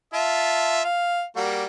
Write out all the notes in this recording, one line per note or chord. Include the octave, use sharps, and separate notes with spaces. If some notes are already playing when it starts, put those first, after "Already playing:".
F4 E5 A5
F5
G3 A#3 F#4